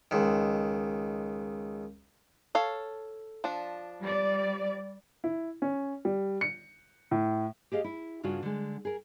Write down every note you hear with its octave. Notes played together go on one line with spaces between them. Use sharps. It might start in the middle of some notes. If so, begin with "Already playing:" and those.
C#2 D#3
A4 C#5 F5
F3 D4
G3 D5
E4
C#4
G3
C#7
A2
G4 G#4 D#5 F5
E4
G2 C#3 D4 F4 F#4
D3 G#3
G#4 A#4